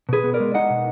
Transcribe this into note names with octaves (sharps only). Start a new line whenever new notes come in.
B2 G#4 B4
B3
A#4 D5
G#3
D#4 D#5 F#5
B2